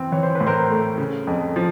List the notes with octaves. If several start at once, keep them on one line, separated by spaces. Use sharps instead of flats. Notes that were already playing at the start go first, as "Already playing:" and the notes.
Already playing: E3 C4
E3 C#5
C5
B4
A2
A#4 C5
A3
C#3
F2
F3